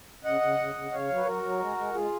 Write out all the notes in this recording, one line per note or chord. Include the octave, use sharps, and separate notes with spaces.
C#3 D#5 F#5
C#3
C#3
C#3
C#3 C#5 F5
F#3
B4
F#3 F#4 A#4
F#3
G#3
G#3
G#3 F4 G#4